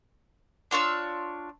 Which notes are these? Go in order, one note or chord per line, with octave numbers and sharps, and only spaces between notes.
D4 F4 C#5 E6